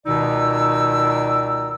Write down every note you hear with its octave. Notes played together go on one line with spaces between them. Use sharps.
C#2 B2 D#3 D#4 D5 E6